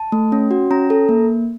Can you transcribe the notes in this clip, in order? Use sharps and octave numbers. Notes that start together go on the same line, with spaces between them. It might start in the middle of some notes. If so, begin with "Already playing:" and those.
Already playing: A5
A3
C#4
F#4
C#4 A#5
A4
A#3